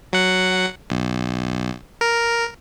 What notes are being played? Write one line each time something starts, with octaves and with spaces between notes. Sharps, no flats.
F#3 F#5
B1
A#4